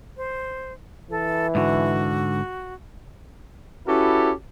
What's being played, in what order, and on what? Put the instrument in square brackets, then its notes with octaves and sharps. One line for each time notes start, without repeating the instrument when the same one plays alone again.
[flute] C5
[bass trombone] E3 [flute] A4
[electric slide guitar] G#2 D3 [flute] F#4
[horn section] C#4 E4 F#4 G4 A4 B4